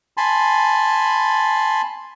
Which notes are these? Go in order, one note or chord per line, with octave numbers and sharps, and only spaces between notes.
G#5 A5 B5 C6